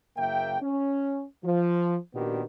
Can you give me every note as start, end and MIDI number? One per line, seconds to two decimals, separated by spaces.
0.17 0.56 30
0.17 0.56 49
0.17 0.56 58
0.17 0.56 76
0.17 0.56 79
0.61 1.24 61
1.44 1.96 53
2.14 2.42 46
2.14 2.42 51
2.14 2.42 59
2.14 2.42 62
2.14 2.42 66
2.14 2.42 67